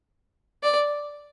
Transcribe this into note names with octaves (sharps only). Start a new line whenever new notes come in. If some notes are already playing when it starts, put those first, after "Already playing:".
D5